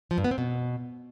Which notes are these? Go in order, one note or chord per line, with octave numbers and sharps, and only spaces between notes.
F3
G2
B3
C4
B2